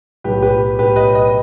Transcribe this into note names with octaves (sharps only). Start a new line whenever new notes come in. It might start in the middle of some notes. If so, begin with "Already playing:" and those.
B1 A2 F#3 G4 B4
G4 B4
B1 A2 F#3 G4 B4
B4 D#5
B4 D#5